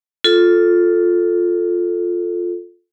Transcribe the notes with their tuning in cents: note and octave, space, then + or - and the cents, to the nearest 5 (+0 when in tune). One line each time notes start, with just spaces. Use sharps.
F4 +5 A4 +0